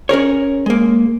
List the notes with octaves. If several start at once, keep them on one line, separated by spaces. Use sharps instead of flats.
C#4 G#4 A#4 C#5
G#3 A#3